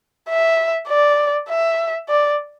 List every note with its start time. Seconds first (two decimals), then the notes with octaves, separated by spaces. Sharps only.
0.29 E5
0.89 D5
1.49 E5
2.09 D5